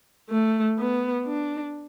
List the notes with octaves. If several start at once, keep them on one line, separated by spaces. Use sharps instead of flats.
A3
B3
D4